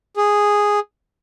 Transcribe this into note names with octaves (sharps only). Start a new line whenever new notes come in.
G#4